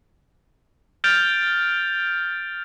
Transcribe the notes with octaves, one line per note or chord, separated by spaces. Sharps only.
F6 G6 A6 D7 F7